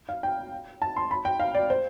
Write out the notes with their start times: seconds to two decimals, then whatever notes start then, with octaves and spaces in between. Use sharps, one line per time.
0.09 F5
0.23 G5
0.82 A5
0.97 C6
1.11 B5
1.25 G5
1.40 F5
1.55 D5
1.70 C5